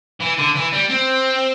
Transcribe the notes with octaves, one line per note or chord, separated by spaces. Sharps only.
E3
D3
E3
G3
C4